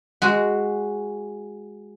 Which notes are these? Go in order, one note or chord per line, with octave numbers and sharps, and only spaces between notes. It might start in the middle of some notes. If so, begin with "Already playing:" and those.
G#3 F#4